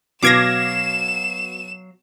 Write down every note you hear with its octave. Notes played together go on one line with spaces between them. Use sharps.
B2 F#3 B3 F5 D6 G#6 A#6 E7